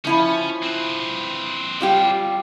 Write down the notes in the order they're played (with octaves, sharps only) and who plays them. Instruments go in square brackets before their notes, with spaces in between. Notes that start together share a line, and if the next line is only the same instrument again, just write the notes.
[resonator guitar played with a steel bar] F3 E4 F4 [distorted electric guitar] C#4
[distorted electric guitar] C4 B4
[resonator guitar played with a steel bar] G3 F4 G4